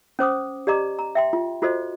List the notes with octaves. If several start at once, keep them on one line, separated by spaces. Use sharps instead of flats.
C#4 C5 D6 D#6
G4 D5 D#5 A#5 D6
A#5
E5 G5 C6
F4
F4 F#4 A4 C5 D#5